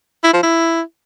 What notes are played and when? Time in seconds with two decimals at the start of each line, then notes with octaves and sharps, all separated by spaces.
0.24 E4
0.33 F3
0.43 E4